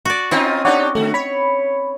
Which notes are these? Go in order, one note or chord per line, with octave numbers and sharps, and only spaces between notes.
F#4 D5
C4 C#4 D#4 F4 D#5
D4 D#4 G4 C#5 D5 F#5
D3 F3 A3 F#4
C#5 B5